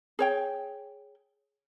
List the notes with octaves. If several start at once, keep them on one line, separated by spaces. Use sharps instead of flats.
G#4 C#5 G5